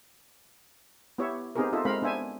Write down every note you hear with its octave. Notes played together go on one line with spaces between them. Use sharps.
B3 E4 G4 C#5 E5
B3 C4 D#4 G4 G#4 A#4
D#4 F4 A4 D#5 E5
G#3 C4 A#4 F5 B5
B3 D4 C5 E5 G#5